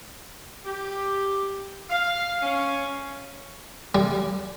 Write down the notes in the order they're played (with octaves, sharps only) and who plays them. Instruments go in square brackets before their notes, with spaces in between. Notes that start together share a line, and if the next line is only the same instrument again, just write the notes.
[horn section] G4
F5
C#4
[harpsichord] G3